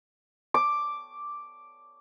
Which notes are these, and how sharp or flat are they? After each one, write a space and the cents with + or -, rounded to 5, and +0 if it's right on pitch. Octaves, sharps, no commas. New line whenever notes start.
D6 +0